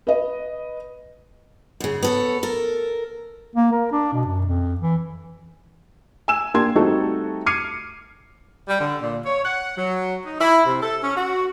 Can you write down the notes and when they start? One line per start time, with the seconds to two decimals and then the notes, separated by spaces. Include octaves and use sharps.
0.07 B4 D#5
1.80 F#2 C#3
2.03 B3 A4 C#5
2.43 A4 A#4
3.56 A#3
3.72 A#4
3.92 D4
4.13 B2
4.26 F#2
4.47 F2
4.81 E3
6.28 G#5 E6 E7
6.54 A#3 D4 G4 C6 G#6
6.75 G3 A3 C4 D#4 F#4 A4
7.46 D6 F6 G#6 C7 C#7 D#7
8.69 G3
8.81 D3
9.02 A#2
9.25 C#5
9.45 F#5
9.78 F#3
10.26 D#4
10.41 E4
10.66 C3
10.82 A4
11.04 C#4
11.17 F#4